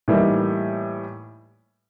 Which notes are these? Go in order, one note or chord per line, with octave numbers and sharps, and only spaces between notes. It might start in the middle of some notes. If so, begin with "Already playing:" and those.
A2 E3 G3 A#3 D#4